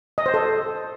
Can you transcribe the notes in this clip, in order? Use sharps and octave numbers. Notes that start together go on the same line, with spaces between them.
D#5
C5
A4